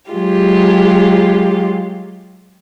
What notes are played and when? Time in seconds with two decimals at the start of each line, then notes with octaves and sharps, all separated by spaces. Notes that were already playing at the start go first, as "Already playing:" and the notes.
0.10 F#3 G#3 F4 G4